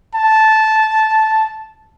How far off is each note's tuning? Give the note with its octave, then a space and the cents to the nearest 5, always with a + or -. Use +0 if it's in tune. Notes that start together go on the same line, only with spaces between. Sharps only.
A5 -10